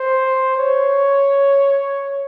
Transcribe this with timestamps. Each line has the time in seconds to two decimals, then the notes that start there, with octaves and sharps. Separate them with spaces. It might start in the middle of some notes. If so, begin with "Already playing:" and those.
Already playing: C5
0.58 C#5